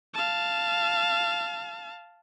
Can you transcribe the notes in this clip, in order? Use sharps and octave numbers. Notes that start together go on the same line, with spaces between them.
F5 A5